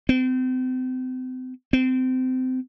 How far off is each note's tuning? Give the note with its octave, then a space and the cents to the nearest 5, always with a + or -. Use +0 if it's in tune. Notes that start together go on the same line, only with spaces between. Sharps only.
C4 -35
C4 -25